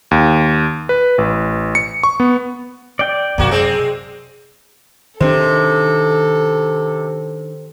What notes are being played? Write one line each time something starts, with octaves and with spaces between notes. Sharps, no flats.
D#2
B4
A1
C#7
C#6
B3
D5 G5
F#2 C3 A#3 F#4
G#3 C4
C3 D#3 D4 A4 C5